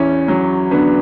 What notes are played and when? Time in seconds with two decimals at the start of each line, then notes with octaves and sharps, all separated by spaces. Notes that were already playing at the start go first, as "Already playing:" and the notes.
Already playing: E2 C#4 E4
0.28 F#3
0.71 D3 B3 D4